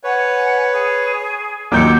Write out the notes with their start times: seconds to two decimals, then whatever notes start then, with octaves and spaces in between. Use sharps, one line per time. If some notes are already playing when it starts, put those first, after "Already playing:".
0.04 B4 C#5 F#5 G#5
0.71 G#4
1.72 D#2 A#2 F#3 D6 E6 G6 C#7